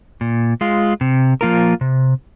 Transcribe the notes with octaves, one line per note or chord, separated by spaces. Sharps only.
A#2
G#3 F4
C3
F3 A#3 F4 A#4
C3